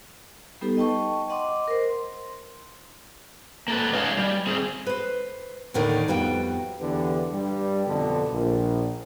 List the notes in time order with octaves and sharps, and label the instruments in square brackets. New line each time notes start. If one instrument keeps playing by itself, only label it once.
[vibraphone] G3 B3 D#4 G4 A4 B4
D#5 G5 A5 C#6
D#5 F#5 C6 D6
A#4 C5
C6
[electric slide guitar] A#3 A4 B4
G#3 C#4 D#4 F#4 C#5 F5
G3
C4 G#4
[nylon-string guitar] B4 C5
D#2 A2 D3 D#3 A#4 D5
F2 G3 B3 F4 F#4 G5
[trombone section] E2 D3 G4 B4
G2 G3
F2 B2 D3
A#1